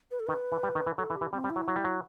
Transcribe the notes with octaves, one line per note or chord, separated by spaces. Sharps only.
B4
A4
D#3 B4
E3
G3
D#3
E3
F#3 A4
E3
G4
E3
G3 C4
G3
E4
F#3
F#3
G3
F#3